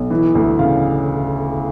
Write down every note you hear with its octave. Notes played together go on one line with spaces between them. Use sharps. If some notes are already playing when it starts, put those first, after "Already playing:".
Already playing: B1
E3
D2
C#3 F5